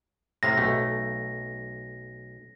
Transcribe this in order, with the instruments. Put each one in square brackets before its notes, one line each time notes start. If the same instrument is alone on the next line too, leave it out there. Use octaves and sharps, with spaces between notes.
[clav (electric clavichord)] A2 C3 F5 [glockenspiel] A#6
[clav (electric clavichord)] B1 A3